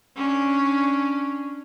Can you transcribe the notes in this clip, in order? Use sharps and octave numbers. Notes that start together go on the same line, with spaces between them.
C#4 D4